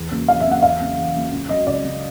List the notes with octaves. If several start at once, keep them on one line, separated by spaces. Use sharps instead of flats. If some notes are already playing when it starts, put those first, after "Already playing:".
Already playing: E2
C#3 F#3 A#3
E2 F5
E5
C#3 F#3 A#3 F#5
E2 F5
C#3 F#3 A#3
E2
C#3 F#3 A#3
C#2
C#3 F#3 D#5
C#2 D5
C#3 F#3